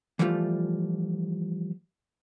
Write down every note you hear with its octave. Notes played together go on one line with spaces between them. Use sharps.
E3 F3 G3 A3 F4